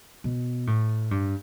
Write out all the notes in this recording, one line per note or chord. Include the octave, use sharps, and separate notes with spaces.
B2
A2
G2